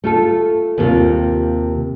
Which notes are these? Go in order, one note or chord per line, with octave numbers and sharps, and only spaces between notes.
A3 F4 A4
D#2 C3 F4